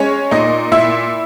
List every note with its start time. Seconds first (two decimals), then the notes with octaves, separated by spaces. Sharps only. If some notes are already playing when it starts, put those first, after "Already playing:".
Already playing: G#3 C#4 C#5
0.31 A#2 D#4 D#5
0.71 A#2 E4 E5